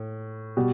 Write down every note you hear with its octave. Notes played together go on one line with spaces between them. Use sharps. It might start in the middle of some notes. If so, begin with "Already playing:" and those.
Already playing: A2
B2 G3